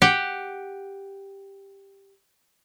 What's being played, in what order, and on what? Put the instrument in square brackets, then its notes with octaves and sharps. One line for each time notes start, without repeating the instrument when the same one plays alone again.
[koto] G4 F#5